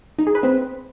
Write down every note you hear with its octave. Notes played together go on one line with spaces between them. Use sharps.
D#4
G#4
B4
C4